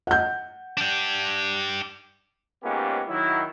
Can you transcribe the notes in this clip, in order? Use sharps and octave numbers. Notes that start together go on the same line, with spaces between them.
F#5 G6
D4 G4
C#2 G#2 A#3 B3 C#4 G4
D#3 F#3 E4